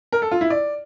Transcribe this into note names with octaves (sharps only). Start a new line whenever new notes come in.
A#4
A4
F4
E4
D5